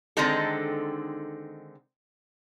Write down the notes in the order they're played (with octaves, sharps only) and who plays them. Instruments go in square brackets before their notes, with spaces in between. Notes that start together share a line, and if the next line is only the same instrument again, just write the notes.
[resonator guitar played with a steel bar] D3 D#3 G#3 C4 D#4 A4